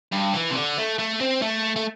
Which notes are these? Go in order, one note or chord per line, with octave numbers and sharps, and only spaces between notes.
G2
E3
C3
D3
A3
A3
C4
A3
A3